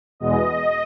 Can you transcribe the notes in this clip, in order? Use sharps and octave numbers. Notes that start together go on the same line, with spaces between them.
E2 B2 G#3 B3 D#5